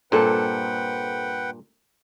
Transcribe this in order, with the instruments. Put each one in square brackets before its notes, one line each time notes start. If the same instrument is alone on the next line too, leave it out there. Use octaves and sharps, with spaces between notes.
[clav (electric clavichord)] G2 A#2 [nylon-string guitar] C4 A4 [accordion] B4 F#5 G5